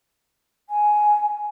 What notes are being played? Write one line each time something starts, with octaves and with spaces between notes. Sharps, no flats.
G#5